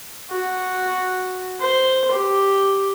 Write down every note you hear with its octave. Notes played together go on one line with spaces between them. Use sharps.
F#4
C5
G4